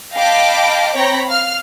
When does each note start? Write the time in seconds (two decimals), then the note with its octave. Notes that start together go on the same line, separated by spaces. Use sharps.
0.14 D#5 F5 G5 A5 B5 D6
0.95 C4 C#5 G5 A#5 B5
1.27 F5 F6